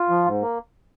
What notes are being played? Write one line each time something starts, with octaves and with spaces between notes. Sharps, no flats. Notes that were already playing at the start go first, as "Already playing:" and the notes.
Already playing: F4
F3
G#2
A#3